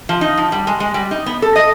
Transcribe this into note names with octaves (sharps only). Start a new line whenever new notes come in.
F3
D#4
F3
G3
G#3
G#3
G3
D#4
B3
A4
D#5